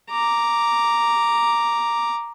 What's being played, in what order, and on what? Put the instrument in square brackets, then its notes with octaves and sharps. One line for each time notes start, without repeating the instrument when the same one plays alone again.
[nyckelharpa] A#5 D6